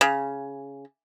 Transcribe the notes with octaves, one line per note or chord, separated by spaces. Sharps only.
C#3